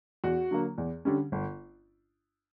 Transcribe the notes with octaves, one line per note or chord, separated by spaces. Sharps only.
E2 F#4
D3 F#3 A#3
E2
D3 G3 C#4
G1